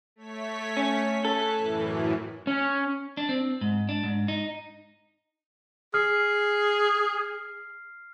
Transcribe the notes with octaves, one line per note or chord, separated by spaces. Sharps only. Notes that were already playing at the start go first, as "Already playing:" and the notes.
A3 C#5 B6
C#4
A4 G#5 F#6
F#2 A2 E3
C#4
D4
C4
G#2
D4
G#2
D#4
G#4 F6 C7